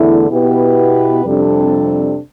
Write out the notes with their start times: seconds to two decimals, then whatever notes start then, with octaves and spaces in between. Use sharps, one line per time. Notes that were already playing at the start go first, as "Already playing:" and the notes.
Already playing: E2 D3 A3 E4
0.29 B2 B3 E4 G4 B4
1.23 F2 C3 G3 D4 A4